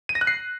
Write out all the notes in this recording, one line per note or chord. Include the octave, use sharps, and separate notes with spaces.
D#7
A#6
F#6
C7